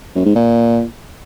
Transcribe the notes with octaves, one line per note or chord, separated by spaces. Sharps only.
F#2
G#2
A#2